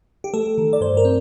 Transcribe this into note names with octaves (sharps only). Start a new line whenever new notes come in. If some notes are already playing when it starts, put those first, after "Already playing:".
G4
A3 A4
D#3
D5
G2 C5
A#4
C4